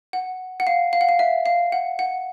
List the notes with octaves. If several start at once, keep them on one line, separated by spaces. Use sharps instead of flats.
F#5
F#5
F5
F5
F#5
F5
E5
F5
F#5
F#5